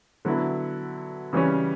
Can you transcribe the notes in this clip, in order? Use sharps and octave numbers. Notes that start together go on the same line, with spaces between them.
D3 F#3 B3 E4
C#3 E3 G3 C#4